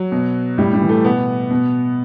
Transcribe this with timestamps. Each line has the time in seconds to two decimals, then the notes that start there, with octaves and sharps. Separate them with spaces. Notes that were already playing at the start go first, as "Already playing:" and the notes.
Already playing: F#3
0.12 B2
0.58 A2 G3
0.73 G3
0.81 E3
0.89 A3
1.04 B2 B3
1.51 B2